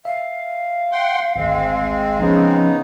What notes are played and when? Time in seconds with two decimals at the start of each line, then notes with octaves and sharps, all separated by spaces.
0.05 E5 F5
0.92 F#5 G5 C6
1.36 G#1 D2 G#3 C4
2.19 C#3 F3 B3 C#4 D#4 G#4